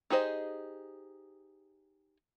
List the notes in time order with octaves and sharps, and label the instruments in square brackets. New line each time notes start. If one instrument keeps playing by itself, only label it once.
[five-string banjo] D#4 G4 G#4 C5 D#5